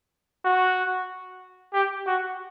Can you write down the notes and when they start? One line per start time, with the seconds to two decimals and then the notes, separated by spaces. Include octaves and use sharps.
0.45 F#4
1.74 G4
2.07 F#4